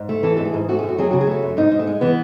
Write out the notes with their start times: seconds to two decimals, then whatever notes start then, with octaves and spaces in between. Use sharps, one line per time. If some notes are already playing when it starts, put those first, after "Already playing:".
Already playing: G#2
0.09 A3
0.23 E3 A4
0.37 G#2 A4
0.45 G#4
0.54 G#2
0.68 A3 F#4
0.79 G#4
0.83 F#2
0.88 F#4
0.98 F#3 G#4
1.11 C#3 F#4
1.21 G#4
1.27 A3 F#4
1.42 F#2
1.57 G#2 D#4
1.72 G#2
1.79 A3
1.87 G#3
2.01 E3 B3